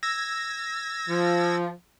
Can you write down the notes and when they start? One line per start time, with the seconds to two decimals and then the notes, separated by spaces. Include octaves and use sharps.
0.03 E6 G#6 A#6
1.09 F3